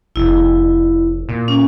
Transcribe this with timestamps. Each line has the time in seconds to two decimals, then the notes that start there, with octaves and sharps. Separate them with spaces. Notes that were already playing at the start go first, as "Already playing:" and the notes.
0.16 F1 E4
1.29 A#2
1.48 C#4